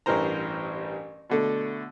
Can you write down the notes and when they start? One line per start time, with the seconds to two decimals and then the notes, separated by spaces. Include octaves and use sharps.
0.06 A1 G2 E3 A#4 C5 A#5
1.30 B2 D3 A3